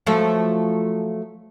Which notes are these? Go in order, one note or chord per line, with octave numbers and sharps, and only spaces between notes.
F3 F#3 A3